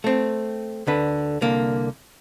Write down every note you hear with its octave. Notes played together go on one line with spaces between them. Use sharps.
A3 C4
D2 D3 B4
C2 D3 A#3